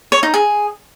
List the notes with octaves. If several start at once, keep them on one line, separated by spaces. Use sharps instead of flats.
C#5
D#4
G#4